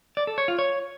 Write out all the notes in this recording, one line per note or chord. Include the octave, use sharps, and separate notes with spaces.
D5
A4
C#5
F4
C#5